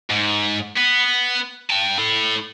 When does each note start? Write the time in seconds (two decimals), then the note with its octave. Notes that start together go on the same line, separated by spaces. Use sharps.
0.11 G#2
0.77 B3
1.70 G5 A5
1.98 E4 A4